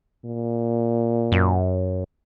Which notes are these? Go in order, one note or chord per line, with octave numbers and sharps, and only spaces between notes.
A#2
F#2